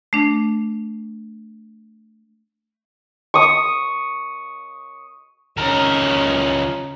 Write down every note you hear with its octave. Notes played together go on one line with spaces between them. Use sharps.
A3 D4
C#6 D#6
C#2 C#4 D#4 A#4